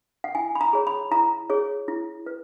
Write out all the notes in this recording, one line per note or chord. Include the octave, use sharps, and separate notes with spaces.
F#5
E4 G#5
B5
A#5
G#4 C#5
B5
E4 A#5
G#4 C#5
E4
B4